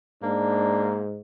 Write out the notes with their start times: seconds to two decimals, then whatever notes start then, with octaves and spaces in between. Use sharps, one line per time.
0.23 G#2 A#3 D4